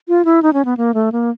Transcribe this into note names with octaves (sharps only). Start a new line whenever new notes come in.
F4
E4
D#4
C#4
B3
A#3
A3
A#3